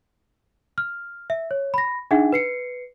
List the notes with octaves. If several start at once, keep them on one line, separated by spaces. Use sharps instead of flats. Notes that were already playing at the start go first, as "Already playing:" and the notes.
F6
E5
C#5
B5 A#6
D4 D#4 G#4 E5 F#5
B4 C7 C#7